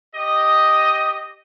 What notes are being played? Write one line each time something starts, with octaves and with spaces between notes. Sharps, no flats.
G4 D#5